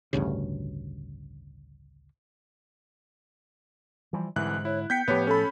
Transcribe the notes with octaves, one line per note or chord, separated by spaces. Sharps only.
A1 D2 G2 C#3
E3 F3 G3
C2 G#2 D3 E3 F#6
E4 C#5
B3 G5 G6 B6 C#7
A2 F3 B3 G4 C#5
C#4 A4 B5